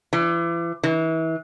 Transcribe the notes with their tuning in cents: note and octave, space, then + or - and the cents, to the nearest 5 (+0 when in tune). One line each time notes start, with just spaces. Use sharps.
E3 +40
E3 -30